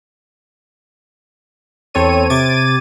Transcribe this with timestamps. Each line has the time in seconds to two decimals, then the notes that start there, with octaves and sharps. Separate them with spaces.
1.94 E2 C4 A4 C#5 D#7
2.30 C3 D6 G#6 A6 D#7